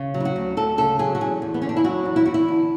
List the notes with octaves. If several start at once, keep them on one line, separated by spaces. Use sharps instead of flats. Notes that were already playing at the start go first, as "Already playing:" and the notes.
Already playing: C#3
F#3
E4
F#4
D2
D2 A4
C#3 A4
F#3 G#4
F#4
E2 G#4
E2
B3
D3 C#4
D4
E4
F#3 F#4
E2
E4
E2 F#4
E4
D3